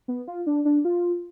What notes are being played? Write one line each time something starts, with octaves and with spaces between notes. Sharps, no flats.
B3
F4
D4
D4
F4